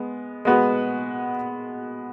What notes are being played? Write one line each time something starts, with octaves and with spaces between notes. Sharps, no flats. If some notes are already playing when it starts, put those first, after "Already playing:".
Already playing: G#3 B3
G#3 B3 F#4 B4